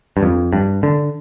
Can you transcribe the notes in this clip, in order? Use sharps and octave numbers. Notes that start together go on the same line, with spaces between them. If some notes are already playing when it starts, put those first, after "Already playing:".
G2
F2
G2
D3